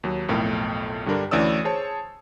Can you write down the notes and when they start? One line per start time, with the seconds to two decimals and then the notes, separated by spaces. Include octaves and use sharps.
0.04 D#2 F#3
0.28 B1 F2 A2 A#4 G5
1.06 G2 D3 G3 D4 A#4
1.31 D2 E3 C#4 D5 D#6 E6
1.65 G#4 C5 C#5 A5